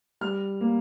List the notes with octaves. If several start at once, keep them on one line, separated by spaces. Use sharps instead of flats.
G3 F6
A#3